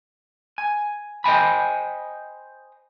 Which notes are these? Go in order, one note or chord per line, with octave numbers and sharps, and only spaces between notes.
G#5
C5 D#5 G5 G#5 B5